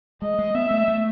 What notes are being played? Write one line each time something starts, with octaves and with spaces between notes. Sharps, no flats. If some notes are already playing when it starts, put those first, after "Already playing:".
G#3 D#5
G#3
B3 E5
A3
A3